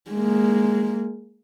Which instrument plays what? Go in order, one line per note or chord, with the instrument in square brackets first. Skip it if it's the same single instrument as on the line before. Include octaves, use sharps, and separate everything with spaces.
[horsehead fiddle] G#3 A#3